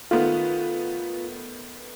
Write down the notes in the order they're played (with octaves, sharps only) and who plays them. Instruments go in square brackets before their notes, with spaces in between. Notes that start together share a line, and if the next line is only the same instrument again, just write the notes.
[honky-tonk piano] D#3 A3 B3 [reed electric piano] F4